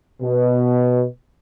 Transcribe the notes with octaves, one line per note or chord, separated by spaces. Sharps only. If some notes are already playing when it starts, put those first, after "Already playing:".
B2